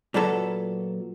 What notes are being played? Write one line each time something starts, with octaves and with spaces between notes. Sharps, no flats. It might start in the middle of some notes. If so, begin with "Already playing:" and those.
A#2 F#3 B3 A4